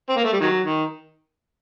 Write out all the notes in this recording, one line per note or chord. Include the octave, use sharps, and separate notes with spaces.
C4
A#3
A3
G3
D#3 F#3
D#3